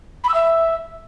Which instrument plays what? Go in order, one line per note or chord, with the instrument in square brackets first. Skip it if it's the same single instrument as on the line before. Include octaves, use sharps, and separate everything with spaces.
[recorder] B5
E6
E5